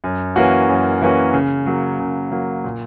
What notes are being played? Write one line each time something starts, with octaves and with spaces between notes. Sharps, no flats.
F#2
E3 A#3 C#4 F#4
F#2
E3 A#3 C#4 F#4
C#3
F#3 A#3
C#3
F#3 A#3
A#2